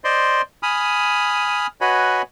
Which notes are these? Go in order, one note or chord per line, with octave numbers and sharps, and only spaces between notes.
C5 D5 D#5 C6
G#5 B5 D#6 F6
F#4 B4 C#5 D#5 G#5 B5